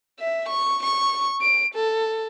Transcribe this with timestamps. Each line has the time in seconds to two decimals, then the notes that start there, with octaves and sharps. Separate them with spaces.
0.19 E5
0.49 C#6
0.83 C#6
1.41 D7
1.74 A4